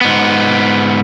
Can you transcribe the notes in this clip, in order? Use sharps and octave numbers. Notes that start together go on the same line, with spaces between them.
G#2 B3